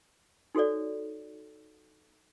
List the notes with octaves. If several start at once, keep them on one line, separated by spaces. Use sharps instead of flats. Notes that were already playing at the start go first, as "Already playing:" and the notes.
D#4 F#4 A4 C#5 D5